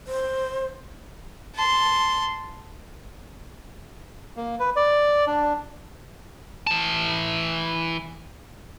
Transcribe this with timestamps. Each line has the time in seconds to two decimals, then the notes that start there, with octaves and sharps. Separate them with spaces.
0.07 C5
1.55 A5 C6
4.37 A#3
4.60 B4
4.76 D5
5.27 D4
6.67 E3 A5